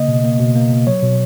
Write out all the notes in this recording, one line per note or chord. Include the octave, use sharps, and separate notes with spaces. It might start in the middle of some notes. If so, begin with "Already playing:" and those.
Already playing: C#3 A#3 D#5
B2
A#3
B2
A#3
B2
F#3 C#5
B2